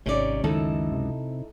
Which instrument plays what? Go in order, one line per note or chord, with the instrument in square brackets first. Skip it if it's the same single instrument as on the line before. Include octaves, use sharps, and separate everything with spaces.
[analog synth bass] G#1 [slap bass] C3 [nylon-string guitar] C#4 D#4 D5
[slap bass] C#2 F#2 [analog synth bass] D#3 [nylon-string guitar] D#4 E4 A4
[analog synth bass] C3